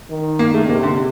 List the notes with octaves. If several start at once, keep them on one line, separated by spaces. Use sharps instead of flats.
D#3
A#3
A3
C3 A#3
D3